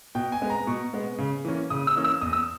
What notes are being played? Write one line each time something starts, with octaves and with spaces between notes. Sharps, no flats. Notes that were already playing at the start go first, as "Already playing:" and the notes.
B2 G5
G#5
G#3 B3
A#5
B2 C#6
G#3 B3
C#3
E3 A#3 C#4
C#3 D#6
E6
E3 A#3 C#4
E6
E2 D#6
E6